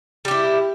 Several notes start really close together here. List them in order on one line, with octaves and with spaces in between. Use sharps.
G3 G4 E4